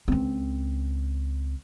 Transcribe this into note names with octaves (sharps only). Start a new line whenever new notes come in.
C#2 C4